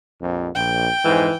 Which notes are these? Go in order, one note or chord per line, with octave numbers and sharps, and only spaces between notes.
A#1 F2
A#1 G5
F2 G#2 E3